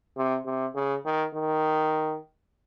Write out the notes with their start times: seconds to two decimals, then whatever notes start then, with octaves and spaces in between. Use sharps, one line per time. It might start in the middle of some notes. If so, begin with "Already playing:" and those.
0.17 C3
0.45 C3
0.75 C#3
1.05 D#3
1.34 D#3